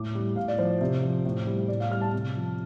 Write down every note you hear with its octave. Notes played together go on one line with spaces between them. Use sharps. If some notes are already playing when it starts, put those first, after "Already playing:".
Already playing: A2 D6
G3
A2 F5
D5
F3 C5
C3
F3
A2
G3
A2 D5
F5
G3 F6
A5
C3
F3